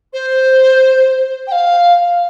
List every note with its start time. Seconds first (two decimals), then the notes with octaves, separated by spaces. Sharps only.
0.13 C5
1.47 G5
1.52 F5